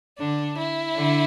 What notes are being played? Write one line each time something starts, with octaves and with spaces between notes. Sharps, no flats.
D3 D4
E4
D3